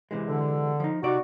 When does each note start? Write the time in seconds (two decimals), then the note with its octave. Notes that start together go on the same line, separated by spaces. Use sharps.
0.11 C3 E3 G#3
0.28 D3
0.80 F3 D#4
1.03 C3 D#4 F#4 D5